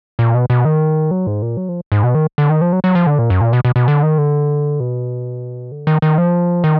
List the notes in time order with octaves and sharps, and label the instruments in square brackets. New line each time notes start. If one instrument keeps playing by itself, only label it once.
[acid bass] A#2
B2
B2
D#3
F#3
G#2
A#2
F#3
F3
G#2
B2
D#3
D3
D#3
F3
F#3
F#3
F3
D3
A#2
F#2
A#2
B2
B2
B2
D3
D#3
D3
B2
D3
D#3
D#3
F3
D#3